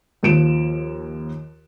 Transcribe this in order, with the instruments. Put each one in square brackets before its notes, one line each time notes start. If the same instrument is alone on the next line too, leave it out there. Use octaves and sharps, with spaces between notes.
[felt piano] D#2 F3 D7 E7